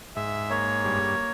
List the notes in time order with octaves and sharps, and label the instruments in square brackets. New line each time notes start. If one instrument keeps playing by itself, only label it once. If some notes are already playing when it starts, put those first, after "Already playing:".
[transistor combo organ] G#2 [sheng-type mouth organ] E5
[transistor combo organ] A#3 [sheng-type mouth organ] C#5
[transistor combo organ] G2